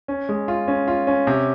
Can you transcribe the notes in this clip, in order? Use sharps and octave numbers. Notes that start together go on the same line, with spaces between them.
C#4
G#3
F4
C#4
F4
C#4
C3